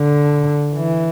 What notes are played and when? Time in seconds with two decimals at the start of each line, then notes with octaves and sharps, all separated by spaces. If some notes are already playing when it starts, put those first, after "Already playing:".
Already playing: D3
0.75 E3